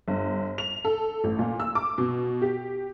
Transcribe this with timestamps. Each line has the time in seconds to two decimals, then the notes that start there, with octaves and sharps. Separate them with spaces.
0.08 G1
0.58 F7
0.85 A4
1.24 A1
1.39 A#2
1.60 E6
1.75 D6
1.98 B2
2.42 G4